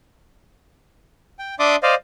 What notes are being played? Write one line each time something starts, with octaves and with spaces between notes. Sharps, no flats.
G5
D4 D5 E5 C6 D6 D#6
C5 D5 D#5 F5